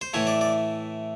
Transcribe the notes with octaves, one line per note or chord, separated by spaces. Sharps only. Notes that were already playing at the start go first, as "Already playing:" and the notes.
C5
A2 E3 A3 C#5
D5
D5